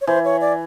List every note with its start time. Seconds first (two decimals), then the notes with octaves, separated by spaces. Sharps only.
0.01 C#5
0.07 E3 C5
0.25 C#5
0.41 D5